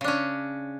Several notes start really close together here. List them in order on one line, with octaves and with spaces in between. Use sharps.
C#3 D4 C#4